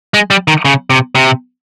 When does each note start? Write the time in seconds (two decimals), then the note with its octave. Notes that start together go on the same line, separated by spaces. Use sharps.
0.14 G#3
0.30 G3
0.48 D#3
0.65 C#3
0.90 C3
1.15 C3